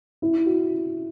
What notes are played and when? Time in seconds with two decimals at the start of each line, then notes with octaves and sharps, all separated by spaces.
0.22 E4
0.46 F#4